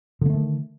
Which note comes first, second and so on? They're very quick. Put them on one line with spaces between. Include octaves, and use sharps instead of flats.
D3 A#3 A3 D#3